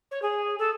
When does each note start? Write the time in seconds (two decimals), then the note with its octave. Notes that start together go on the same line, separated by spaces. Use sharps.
0.11 C#5
0.22 G#4
0.58 A4